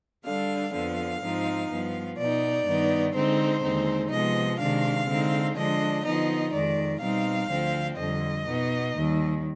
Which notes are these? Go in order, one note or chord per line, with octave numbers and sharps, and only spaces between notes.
D3 G3 D4 F5
F2 D3 F3 B3 F5
G#2 F3 C4 D#4
G2 F3 B3
B2 B3 D#4 D5
G2 D#3 B3 D#4
D3 G#3 C4 D#4 C5
D#2 D3 G#3 C4 D#4
C3 F3 G#3 B3 D#5
C3 D#3 G#3 D4 F5
D3 G#3 C4 D#4
D3 F3 G#3 D4 D#5
D3 F3 B3 D#4 D#5
F2 D#3 G#3 D5
B2 G3 C4 D#4 F5
D2 D3 F3 C4
F2 D3 G3 D#5
B2 B3 D#4
D#2 D#3 G3